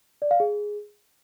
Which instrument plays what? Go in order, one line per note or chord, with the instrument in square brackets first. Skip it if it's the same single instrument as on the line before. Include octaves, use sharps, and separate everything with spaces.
[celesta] D5
F5
G#4